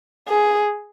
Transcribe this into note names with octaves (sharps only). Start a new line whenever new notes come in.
G#4